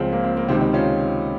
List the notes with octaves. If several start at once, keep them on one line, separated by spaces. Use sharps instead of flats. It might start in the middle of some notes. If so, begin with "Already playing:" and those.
Already playing: C#2 C#3 F3 C4
A#3
C4
A#3
C#2 C3 D#3 C4
C4 D#4
C#4 F4